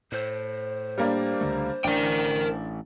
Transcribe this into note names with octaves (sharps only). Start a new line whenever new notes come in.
A2 C5
G3 A#3 D4
C#2 D3 A3
A1 D4 A#4 G5